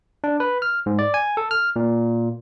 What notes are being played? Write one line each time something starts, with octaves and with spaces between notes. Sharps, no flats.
D4
B4
F6
G#2
D5
G#5
A4
F6
A#2